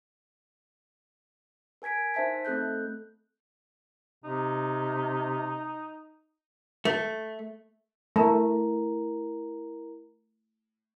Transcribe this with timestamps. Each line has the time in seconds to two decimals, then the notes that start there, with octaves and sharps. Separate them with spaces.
1.82 A#4 G#5 G#6 B6 D7
2.14 D#4 C5 E5 A5 B6
2.45 A3 C4 A4 F#6 G6
4.25 C3 D#4
6.85 A3
8.16 A3 E4 A#4 A#5